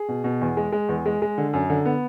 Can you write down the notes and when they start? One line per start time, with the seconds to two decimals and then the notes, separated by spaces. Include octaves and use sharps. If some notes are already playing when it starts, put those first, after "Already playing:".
Already playing: G#4
0.08 B2
0.24 B2
0.41 E2
0.57 G#3
0.72 G#3
0.89 E2
1.06 G#3
1.22 G#3
1.38 D3
1.53 F#2
1.70 D3
1.86 B3